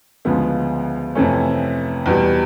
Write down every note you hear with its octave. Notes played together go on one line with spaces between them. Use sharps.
D2 C#3 F3 G#3 B3
F2 C3 E3 A3 C#4
E2 B2 G3